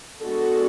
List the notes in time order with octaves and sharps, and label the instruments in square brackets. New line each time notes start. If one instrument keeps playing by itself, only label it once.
[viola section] G#3 B3 D4 F#4 A4